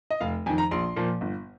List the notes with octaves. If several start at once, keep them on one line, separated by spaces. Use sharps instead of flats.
D#5
F1 F5
F2 D#3 G#5
A#5
A#1 C6
A#2 F3 A#3
G1